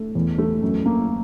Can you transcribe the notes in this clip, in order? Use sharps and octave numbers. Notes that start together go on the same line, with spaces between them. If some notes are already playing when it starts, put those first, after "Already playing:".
Already playing: A3
E2
A3
F#2
A#3